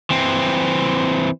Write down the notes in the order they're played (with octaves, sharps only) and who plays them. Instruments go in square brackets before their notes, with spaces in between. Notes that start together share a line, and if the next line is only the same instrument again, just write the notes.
[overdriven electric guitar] E3 C4